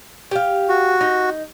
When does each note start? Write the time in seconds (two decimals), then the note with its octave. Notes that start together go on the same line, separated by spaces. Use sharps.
0.31 G4 F5
0.69 F#4
1.01 D#4